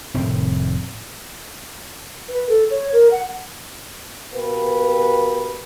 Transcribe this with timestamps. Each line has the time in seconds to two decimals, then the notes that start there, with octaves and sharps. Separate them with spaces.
0.14 F1 A2 D#3 C4
2.29 B4
2.49 A4
2.71 C#5
2.93 A#4
3.11 F#5
4.34 B2 A#3 G4 B4